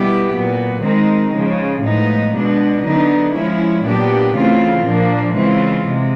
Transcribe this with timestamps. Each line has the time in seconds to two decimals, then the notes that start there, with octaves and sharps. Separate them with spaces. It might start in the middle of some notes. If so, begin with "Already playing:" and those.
Already playing: B2 G3 B3 E4 G4
0.33 A#2 F#3 B3
0.82 D#3 G#3 C4 D#4
1.33 C#3 F3 G#3
1.82 A2 F3 G#3 B3 D#4
2.33 B2 G#3 B3 D4
2.84 D3 F#3 B3 D#4
3.35 F3 G#3 C#4 E4
3.84 A#2 F#3 B3 D4 G4
4.35 C#3 E3 A3 C4 F4
4.85 A#2 F3 A#3 D4
5.35 C#3 E3 G#3 C4 F4
5.86 C3 G#3